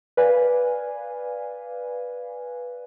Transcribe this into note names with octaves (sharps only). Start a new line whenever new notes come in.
B4 D5 F5 G#5